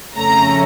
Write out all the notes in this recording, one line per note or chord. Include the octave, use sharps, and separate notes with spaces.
F2 C#3 A3 C#4 A#5